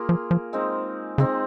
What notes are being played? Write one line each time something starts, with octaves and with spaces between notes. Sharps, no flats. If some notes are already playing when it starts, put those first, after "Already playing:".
Already playing: A#3 F4 G#4
F3
F3
G#3 C4 D#4
C#3 G#3 C4 D#4